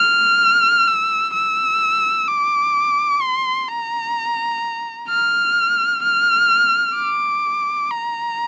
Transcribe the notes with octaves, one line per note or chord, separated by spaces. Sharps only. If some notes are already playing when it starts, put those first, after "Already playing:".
Already playing: F6
E6
E6
D6
C6
A#5
F6
F6
D6
A#5